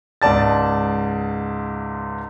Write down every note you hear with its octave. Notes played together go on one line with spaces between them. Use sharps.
C#2 G#2 D5 A5 A6